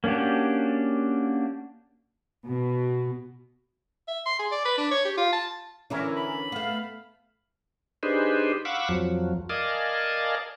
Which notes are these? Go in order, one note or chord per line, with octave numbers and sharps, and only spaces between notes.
A#3 C#4 D4 F#4 G4
B2
E5
C6
G#4
D5
B4
D4
C#5
G4
F4
A5
D3 E3 C#4 D4 E4 A#4
B5
A3 B3 F5
D4 D#4 G4 G#4 B4 C5
F5 F#5 B5 C#6 D6 E6
F2 F3 F#3
A#4 D5 D#5 F5 G#5 A5